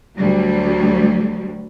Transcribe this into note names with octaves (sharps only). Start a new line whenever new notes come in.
D2 F#3 G3